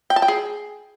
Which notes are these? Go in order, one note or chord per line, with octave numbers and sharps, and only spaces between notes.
G5
A5
G5
G#4